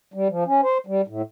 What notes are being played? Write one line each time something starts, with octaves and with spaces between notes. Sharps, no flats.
G3
F3
C#4
C5
G3
A2